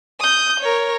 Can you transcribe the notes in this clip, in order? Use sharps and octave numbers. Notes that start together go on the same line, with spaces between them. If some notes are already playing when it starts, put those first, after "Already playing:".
D#6 G6
A#4 C#5